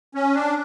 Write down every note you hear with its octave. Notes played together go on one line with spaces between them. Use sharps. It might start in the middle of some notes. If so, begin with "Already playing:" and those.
C#4
D4